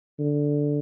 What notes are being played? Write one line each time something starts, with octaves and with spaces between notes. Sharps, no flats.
D3